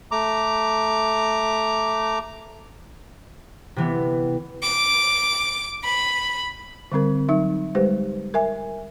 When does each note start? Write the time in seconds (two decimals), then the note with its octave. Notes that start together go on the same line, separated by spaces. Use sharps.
0.11 A3 A#5 D6
3.76 C3 E3 B3
4.63 D6
5.84 B5
6.92 D3 G3 C4 A#4
7.29 F#3 D#4 E5
7.75 G3 G#3 G4 B4 C5
8.34 A#4 E5 G#5